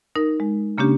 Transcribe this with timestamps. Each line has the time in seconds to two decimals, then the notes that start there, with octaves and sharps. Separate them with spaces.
0.16 D#4 A#4
0.40 G#3
0.78 C#3 A#3 C#4 D4 G4